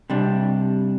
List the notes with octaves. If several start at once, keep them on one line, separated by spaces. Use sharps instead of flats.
C3 G3 D4